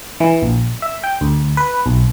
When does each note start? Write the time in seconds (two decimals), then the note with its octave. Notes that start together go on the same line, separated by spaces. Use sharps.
0.20 E3
0.42 A#1
0.82 E5
1.04 G5
1.21 D2
1.57 B4
1.86 B1